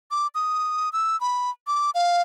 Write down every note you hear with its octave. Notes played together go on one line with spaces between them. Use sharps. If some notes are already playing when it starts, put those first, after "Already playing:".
D6
D#6
E6
B5
D6
F5